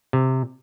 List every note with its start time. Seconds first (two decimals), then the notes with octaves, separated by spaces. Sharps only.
0.13 C3